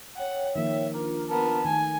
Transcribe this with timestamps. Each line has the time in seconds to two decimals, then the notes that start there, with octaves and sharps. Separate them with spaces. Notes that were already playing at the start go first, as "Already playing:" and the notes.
0.17 C#5 F#5 G5
0.56 D#3 F3 A#3 E5
0.94 D4 F4 A#4
1.30 B3 A#4 A5
1.65 D#3 A3 G#5